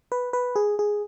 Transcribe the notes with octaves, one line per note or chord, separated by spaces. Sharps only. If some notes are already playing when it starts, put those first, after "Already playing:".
B4
B4
G#4
G#4